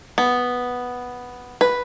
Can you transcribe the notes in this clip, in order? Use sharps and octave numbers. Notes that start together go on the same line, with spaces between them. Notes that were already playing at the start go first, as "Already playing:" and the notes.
B3
B4